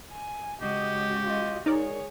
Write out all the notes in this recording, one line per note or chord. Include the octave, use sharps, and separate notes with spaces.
G#5
C#3 G#3 F#4 G4 D#5
F4 D#5
D#4 G#4 A#4 C#5 D5